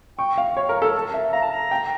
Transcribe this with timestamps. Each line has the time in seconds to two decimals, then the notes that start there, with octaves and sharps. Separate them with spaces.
0.18 G5 C#6
0.38 F5
0.57 C#5
0.69 A#4
0.82 A4
0.94 A5
1.14 E5
1.33 F5 A#5
1.42 A5
1.52 A#5
1.71 G5